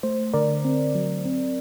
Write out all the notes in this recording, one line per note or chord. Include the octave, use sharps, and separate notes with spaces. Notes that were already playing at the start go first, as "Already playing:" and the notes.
A3 C5
D3 A#4 D5
C4
F#3
C4